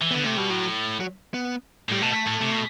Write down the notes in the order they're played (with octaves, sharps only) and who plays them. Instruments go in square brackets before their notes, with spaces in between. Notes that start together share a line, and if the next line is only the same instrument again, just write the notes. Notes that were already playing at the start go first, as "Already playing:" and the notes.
[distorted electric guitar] E3
[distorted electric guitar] D3 [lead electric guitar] B3
[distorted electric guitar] C3 [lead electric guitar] A3
[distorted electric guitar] B2 [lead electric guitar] G3
[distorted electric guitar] A2 [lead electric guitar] F#3
[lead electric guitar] F#3
B3
[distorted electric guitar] A2 [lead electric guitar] G3
[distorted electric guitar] B2 [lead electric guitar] A3
[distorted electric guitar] A2
C3
B2